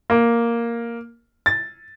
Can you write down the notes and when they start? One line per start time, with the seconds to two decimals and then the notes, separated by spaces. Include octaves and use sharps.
0.10 A#3
1.46 A6